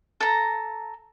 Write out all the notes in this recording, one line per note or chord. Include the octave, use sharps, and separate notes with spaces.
A4 A#5